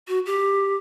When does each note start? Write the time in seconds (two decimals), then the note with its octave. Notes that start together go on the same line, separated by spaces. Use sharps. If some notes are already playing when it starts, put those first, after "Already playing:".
0.08 F#4
0.26 G4